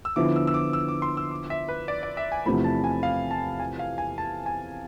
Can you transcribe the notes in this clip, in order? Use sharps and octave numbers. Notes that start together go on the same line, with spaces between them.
E6
D3 F3 B3 E4 D6
E6
E6
D6
E6
D6
C6
E6
D6
E5
B4
D5
D5
E5
G#5
E2 C3 F3 A3 B5
A5
G#5
F5
A5
G#5
F5
G#5
A5
G#5